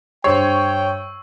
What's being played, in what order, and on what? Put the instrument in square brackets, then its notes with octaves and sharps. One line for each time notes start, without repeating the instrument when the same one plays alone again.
[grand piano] G2 C5 C7 [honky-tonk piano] C#5 [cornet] G5 [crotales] C#6 E6